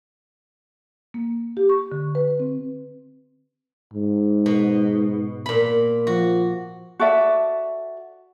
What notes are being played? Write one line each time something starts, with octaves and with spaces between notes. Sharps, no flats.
A#3
G4
C#6
D3
B4
C4
G#2
B2
A#2 B5
F3 F#4
F#4 A4 D5 E5